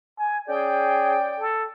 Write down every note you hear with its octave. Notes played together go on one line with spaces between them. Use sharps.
G#5
C#4 G#4 D5 G5
A4